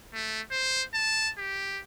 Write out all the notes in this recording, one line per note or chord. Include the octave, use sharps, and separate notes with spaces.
A3
C5
A5
G4